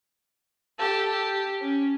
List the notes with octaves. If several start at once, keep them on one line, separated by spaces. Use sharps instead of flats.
G4 A4
G4
C#4